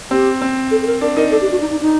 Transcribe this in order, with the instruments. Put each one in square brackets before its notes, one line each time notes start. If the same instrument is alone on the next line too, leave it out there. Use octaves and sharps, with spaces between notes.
[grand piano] C4 [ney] G4
[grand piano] C4
[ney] A4
A4
A#4
[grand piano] D4 [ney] A#4
[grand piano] D#4 [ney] A#4
[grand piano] D4 [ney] A4
[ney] G4
F#4
D#4
D#4
D#4